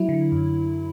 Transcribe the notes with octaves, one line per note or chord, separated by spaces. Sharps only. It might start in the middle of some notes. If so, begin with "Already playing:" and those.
Already playing: F#3 E4
D3
F#2